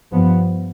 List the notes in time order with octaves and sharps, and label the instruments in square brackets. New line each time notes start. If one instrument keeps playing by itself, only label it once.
[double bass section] G2 F3 B3